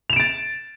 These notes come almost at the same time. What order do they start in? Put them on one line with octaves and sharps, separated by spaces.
F7 E7 D7 A6